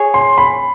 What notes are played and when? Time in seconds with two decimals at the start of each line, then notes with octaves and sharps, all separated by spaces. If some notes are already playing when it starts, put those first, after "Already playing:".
Already playing: G#4 C#5
0.14 C6
0.38 B5